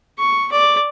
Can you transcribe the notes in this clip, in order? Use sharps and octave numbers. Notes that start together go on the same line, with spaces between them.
C#6
D5